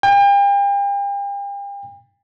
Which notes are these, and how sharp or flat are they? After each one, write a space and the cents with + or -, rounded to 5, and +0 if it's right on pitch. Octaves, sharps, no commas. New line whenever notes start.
G5 +40